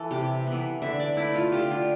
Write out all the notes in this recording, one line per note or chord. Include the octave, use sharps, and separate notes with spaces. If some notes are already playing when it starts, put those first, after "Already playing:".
Already playing: E3 A4
C3 G4
E3 B3
D3 E5
D5
A3 E4
F4
D3 G4
F4